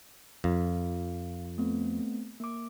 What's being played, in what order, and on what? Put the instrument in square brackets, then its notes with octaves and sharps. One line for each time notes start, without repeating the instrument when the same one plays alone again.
[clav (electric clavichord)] F2 [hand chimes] F5
[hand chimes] A3 B3 C4
A#3 D6